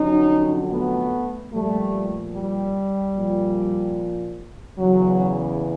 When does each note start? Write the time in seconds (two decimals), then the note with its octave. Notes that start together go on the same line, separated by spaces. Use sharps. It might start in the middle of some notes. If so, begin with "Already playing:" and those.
Already playing: F2 D3 F#3 C#4 D#4
0.71 A3 B3
1.52 A#2 F3 G3 A3
2.33 G3
3.15 A#2 F3
4.77 E2 C#3 E3 F#3